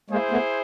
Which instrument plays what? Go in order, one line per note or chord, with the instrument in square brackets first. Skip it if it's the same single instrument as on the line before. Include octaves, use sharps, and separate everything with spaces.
[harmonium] G#3 A#3 [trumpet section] E4 G#4 C5
[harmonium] A3 B3